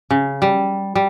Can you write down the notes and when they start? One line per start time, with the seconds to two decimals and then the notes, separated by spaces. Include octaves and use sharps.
0.10 C#3
0.42 G3
0.95 G3